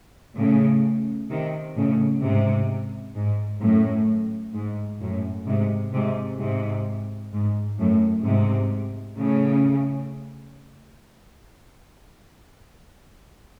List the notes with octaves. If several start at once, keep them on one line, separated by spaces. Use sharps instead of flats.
A2 C#3
C3 D#3
A2 C#3
G#2 C3
G#2
F#2 A2
G#2
F#2 A2
G#2 C3
G#2 C3
G#2 C3
G#2
F#2 A2
G#2 C3
A2 C#3